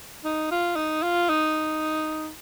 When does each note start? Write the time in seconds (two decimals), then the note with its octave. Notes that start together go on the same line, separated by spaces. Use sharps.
0.24 D#4
0.51 F4
0.76 D#4
1.03 F4
1.29 D#4